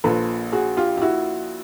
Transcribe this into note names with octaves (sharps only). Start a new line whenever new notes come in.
A#1 A#2 A4 B4
F#4 G#4
F4 G4
G4
E4 F#4